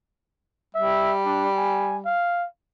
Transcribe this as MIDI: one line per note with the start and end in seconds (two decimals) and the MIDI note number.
0.75 2.14 55
0.75 1.13 76
1.26 1.48 62
1.58 1.97 80
2.06 2.47 77